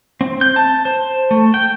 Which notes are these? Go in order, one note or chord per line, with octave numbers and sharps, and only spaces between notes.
C4
G6
A5
C5
A3
G5